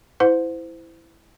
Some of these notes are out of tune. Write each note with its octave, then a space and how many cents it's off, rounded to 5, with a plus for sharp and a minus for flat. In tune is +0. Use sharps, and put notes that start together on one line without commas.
E4 +0 C5 -30 F#5 -35